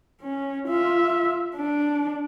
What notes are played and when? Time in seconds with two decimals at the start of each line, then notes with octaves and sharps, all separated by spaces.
0.22 C#4
0.68 F4 E5
1.56 D4